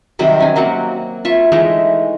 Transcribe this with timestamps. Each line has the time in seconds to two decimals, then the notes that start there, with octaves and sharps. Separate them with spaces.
0.19 C3 D#3 F#3 G3
0.40 C#4 G#5
0.56 F#3 A#3 C4 F#5
1.25 F4 E5 C#6
1.52 E3 G#3 A3 D#4